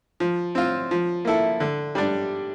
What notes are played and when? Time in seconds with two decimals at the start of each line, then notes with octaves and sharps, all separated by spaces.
0.20 F3
0.55 C4 F4
0.91 F3
1.25 A#3 E4 A4
1.60 D3
1.95 G3 D4